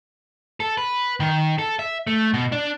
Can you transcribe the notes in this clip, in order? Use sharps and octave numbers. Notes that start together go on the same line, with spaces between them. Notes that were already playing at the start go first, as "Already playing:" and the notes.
A4
B4
D#3
A4
E5
A3
B2
D4